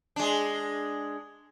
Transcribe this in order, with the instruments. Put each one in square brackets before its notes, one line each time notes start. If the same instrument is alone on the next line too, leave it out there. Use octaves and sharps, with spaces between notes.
[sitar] G#3 D4